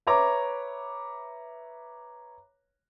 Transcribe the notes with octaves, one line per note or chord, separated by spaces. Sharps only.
B4 C#5 E5 A#5 D6